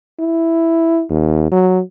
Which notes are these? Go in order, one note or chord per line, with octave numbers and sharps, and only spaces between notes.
E4
D#2
F#3